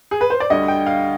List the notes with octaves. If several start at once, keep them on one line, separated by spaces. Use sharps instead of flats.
G#4
B4
C5
D5
D2 D3 G3 D#5
G5
F5